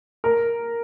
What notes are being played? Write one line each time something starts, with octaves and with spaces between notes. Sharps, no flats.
A#4